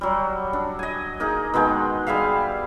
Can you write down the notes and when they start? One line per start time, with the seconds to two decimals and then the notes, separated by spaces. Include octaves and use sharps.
0.01 F#3 G3
0.53 D4
0.79 D#5 G#5
1.20 A#3 D#4 G#4
1.54 B2 D#3 G#3 G5
2.07 G3 G#4 E5 F5